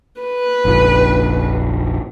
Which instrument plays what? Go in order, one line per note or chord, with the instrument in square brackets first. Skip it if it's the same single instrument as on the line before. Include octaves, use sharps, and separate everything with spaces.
[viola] B4
[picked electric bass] F1 A#1